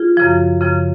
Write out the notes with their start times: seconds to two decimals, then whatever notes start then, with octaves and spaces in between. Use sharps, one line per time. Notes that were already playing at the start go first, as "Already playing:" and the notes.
Already playing: F4 G#4
0.17 F#2 C#3 F3
0.61 F#2 C#3 F3